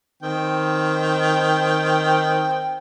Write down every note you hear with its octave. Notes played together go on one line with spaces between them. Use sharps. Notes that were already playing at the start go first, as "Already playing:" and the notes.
D#3 C4 G5